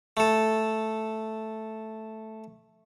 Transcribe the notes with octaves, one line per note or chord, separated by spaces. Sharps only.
A3 A4